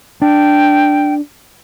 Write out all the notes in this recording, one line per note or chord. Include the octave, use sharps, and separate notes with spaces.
D4 G5